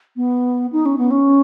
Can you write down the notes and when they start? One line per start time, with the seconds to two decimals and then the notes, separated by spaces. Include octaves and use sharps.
0.16 B3
0.73 D#4
0.86 C#4
0.98 B3
1.11 C#4